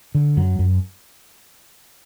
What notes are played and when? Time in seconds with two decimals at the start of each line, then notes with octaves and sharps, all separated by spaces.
0.15 D3
0.37 F#2 F#3
0.59 F#2